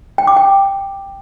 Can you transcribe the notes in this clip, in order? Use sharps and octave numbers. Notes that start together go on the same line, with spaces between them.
G5
D6
G5